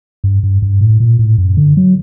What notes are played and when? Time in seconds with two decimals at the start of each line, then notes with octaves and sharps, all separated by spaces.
0.24 G2
0.43 G2
0.62 G2
0.81 A2
1.00 A#2
1.19 A2
1.38 F#2
1.57 D3
1.77 F#3